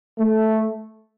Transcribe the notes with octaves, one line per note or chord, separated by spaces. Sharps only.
A3